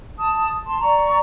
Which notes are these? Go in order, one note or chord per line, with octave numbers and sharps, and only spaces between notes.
A5 D#6
A5 C6
D5 A#5 C#6